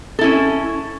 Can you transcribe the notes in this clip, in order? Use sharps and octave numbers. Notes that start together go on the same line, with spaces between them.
C#4 E4 A4